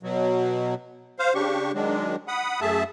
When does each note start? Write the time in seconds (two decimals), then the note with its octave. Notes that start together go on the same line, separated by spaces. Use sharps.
0.03 B2 F#3
1.19 C5 F5
1.34 C#3 D4 G4 C#6
1.74 D#3 F#3 G#3 D4
2.28 F#5 B5 D#6
2.61 F#2 A3 G#4 E5 A5